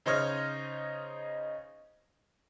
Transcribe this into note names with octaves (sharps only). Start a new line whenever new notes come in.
C#3 D#4 C5 C#5 D#5 F6